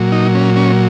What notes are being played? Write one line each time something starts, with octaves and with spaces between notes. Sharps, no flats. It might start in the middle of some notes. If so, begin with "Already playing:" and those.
Already playing: A#2 F#3
D#4
C#4
C#4